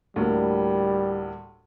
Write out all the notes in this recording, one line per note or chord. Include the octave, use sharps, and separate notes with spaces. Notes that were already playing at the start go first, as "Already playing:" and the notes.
D2 A2 G3 A#3